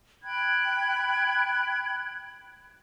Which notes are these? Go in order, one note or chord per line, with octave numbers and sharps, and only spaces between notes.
G5 B5 F#6 G#6